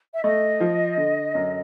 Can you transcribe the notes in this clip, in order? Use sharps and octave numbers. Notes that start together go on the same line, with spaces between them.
E5
A3 D#5
F3
D3
F#2